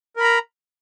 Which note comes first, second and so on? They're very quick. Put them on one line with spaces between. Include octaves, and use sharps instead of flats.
A#4 B5 A#5